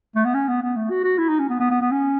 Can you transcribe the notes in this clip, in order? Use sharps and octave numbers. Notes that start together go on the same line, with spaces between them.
A3
B3
C#4
B3
B3
A3
F#4
F#4
E4
D#4
C#4
B3
B3
B3
B3
C#4